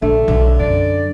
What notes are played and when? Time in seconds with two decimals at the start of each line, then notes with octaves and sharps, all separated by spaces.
0.02 A#1 D3 A3
0.28 B1 D3
0.59 F#2 D5